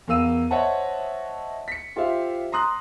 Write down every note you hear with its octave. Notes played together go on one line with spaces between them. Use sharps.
E2 A#4 F5 E6 D#7
C5 C#5 D#5 E5 F#5 A5
B6 C#7
F4 G4 C5 E5 F5
A#5 C6 D#6 F#6